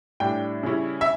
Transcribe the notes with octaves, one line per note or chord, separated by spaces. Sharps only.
A2 G3 D4 G5
C#3 G3 C#4 E4
E5